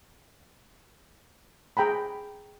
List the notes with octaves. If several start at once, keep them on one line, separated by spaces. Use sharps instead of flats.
G#4 G5 A#5 B5